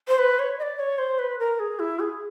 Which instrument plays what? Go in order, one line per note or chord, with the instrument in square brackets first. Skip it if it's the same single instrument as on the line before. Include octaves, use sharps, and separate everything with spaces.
[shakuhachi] C5
B4
C#5
D#5
D5
C#5
C5
B4
A#4
G#4
E4
G#4